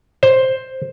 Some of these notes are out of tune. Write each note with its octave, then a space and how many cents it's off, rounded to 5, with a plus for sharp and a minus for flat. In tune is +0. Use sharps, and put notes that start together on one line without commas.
C5 +5